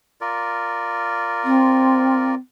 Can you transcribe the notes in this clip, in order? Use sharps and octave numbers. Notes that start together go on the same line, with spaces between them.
F4 A#4 D5
C4